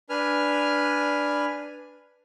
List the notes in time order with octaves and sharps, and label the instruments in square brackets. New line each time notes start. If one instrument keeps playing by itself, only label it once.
[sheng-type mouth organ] D4 B4 G#5 F6